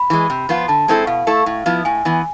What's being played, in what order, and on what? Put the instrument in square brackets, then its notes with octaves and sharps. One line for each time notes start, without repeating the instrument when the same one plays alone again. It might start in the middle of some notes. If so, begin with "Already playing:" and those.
Already playing: [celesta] B5
[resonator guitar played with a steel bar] E3 G#3
C3
F3 B3 F4
[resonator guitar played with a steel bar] D3 [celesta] A5
[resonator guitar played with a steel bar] G#3 C4 E4 A4
[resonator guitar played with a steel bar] B2 [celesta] F5
[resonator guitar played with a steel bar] A3 E4 A4
A2
F3 B3 E4
[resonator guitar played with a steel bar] A2 [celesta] G#5
[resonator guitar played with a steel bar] E3 B3